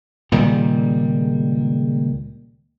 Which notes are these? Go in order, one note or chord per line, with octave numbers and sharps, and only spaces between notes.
C#2 A#2 D#3 G3